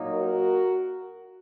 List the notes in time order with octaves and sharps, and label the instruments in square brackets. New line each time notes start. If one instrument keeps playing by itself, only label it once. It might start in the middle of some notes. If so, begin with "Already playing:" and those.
Already playing: [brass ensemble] A#2 F#3 A#3 D#4
F#4 A#4